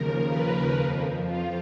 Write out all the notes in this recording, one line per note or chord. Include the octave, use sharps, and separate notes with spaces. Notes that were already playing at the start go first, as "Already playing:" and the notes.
Already playing: D#2 C#3 F3 A#4
B4
F2 F3
F4